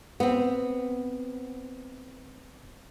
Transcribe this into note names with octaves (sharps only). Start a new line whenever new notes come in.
B3 C4